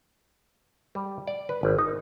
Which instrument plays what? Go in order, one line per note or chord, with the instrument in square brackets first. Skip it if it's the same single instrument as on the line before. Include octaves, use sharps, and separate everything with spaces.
[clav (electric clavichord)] G3
D5
B4
G#1
D#4